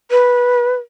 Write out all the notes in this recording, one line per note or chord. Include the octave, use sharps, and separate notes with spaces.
B4